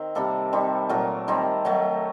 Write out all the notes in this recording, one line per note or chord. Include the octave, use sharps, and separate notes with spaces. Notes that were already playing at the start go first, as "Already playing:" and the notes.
Already playing: D#3 C4
C3 G3 A#3 A4
D#3 G3 C4
A#2 F#3 A3 A#4
D#3 G3 C4
D#3 F#3 A3